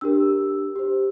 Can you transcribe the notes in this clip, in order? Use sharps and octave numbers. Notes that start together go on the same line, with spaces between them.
D4 G4 A#4 E6
G4 C5